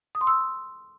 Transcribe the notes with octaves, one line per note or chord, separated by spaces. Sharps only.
D#6
C6
E6